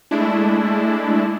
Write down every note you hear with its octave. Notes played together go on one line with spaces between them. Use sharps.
G#3 A3 D4 E4